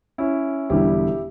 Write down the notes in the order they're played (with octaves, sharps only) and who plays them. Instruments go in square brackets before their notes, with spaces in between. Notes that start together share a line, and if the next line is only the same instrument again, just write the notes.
[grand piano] C#4 E4
E1 E2 D3 G3 E4 G4